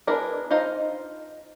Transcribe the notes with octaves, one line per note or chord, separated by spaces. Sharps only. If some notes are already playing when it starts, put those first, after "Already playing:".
B3 D4 E4 G#4 A#4
D#4 F4 C5 D#5